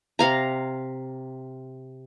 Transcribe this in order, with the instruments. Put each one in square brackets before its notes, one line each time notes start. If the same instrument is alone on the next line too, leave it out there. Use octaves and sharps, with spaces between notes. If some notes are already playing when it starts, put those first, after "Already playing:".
[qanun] C3 F5 A#5